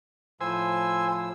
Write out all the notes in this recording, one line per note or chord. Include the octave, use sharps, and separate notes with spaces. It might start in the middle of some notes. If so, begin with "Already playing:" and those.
A2 F3 C5 G#5 E6